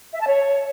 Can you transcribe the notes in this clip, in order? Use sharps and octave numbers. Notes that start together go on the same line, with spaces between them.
E5
A5
C#5